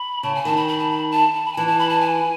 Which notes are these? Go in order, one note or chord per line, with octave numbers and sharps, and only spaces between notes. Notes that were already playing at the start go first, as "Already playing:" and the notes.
Already playing: B5
C#3 A5
G#5
D#3 A5
B5
B5
A5
B5
A5
A5
B5
G#5
E3 A5
A5
B5
A5
G#5